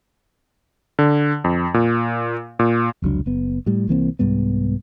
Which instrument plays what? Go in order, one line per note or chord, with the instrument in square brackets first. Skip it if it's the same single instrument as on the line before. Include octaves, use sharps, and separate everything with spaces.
[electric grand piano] D3
F2
A#2
A#2
[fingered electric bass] F1 C#2 F#3 D4
F#1 B3
A2 G3
C2 E3 A#3 C4
C2 G#2 G3 B3